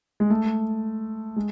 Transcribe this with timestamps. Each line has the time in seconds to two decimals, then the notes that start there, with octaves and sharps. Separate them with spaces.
0.20 G#3
0.30 A3
1.36 G#3